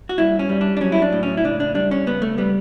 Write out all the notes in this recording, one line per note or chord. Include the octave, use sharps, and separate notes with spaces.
F#4
G2 E4
C#4
G3
D4
D4
F#3 C#4
E4
D4
A2
C#4
E4
C#2 D4
D4
G3 D4
C#4
C#2 B3
A3
G3 B3